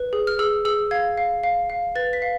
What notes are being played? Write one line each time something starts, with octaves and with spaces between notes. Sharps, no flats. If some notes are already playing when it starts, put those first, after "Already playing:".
Already playing: B4
G#4
F6
G#4 E6
G#4 E6
F5 G#6
F5
F5
F5
B4 A6
B6
F5